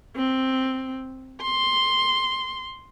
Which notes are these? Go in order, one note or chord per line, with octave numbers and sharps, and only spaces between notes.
C4
C6